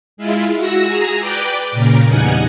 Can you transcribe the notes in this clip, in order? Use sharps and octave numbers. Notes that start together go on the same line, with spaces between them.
G#3 E4 F4
F#4 E6 A#6
G#4 A#5
B4 D5 G5 D6
A#2 C#3 A#4
E2 G3 D#4 F#5 G#5